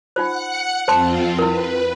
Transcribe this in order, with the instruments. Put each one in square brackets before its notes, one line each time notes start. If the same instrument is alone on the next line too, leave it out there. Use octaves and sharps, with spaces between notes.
[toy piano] D#4 F4 C5 [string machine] F#5 F#6 C#7
[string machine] F2 C4 F4 [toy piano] C5 A5 C6
[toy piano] E4 A#4 [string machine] B4